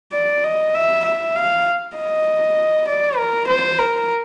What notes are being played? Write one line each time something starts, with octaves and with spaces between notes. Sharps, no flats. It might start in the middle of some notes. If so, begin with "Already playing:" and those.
D5
D#5
E5
E5
F5
D#5
D5
A#4
C5
A#4